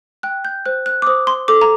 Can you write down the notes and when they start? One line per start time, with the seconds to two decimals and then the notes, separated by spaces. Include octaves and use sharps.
0.23 G5 F#6
0.45 G6
0.66 C5 F#6
0.86 F#6
1.02 D6
1.07 C5 D#6
1.27 C6
1.48 A4 D6
1.62 A#5